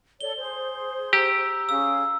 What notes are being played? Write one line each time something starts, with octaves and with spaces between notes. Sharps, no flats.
A4 C#5 D5 G7
G#4 C5
G4 A#5 E6
C#4 G#4 F5 E6